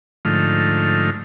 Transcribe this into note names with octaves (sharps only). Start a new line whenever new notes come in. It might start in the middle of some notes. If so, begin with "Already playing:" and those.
G#2 D3 F3 A3 D#4 F6